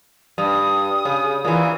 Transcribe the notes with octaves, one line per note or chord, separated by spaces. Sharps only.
G2 D#6
C#3
A#2 E3